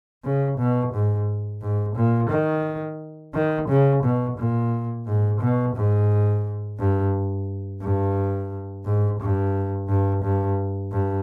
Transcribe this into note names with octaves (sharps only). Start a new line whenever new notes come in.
C#3
B2
G#2
G#2
A#2
D#3
D#3
C#3
B2
A#2
G#2
B2
G#2
G2
G2
G#2
G2
G2
G2
G2